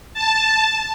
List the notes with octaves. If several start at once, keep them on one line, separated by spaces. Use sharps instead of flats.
A5